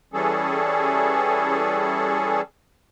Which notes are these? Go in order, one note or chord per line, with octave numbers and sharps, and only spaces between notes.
E3 G3 C#4 G#4 A4